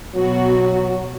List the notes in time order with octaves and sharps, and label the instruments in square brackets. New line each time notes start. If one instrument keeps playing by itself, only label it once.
[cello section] B2 B3 F#4 [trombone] F#3